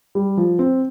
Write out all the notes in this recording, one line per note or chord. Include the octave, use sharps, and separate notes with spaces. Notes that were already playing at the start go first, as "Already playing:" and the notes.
G3
F3
C4